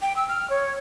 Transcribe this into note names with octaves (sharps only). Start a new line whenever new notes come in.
G5
E6
F6
C#5